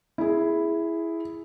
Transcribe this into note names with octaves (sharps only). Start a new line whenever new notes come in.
E4 G#4